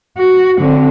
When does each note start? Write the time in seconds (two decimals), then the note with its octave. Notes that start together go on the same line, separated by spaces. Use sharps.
0.17 F#4
0.58 D3 C4